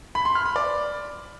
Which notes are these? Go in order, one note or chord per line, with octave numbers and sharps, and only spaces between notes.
B5
C6
F6
B5
D5